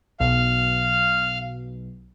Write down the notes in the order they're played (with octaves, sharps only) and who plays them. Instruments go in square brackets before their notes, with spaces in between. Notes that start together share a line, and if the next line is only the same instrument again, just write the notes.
[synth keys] B1 B2 [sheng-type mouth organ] F5 F6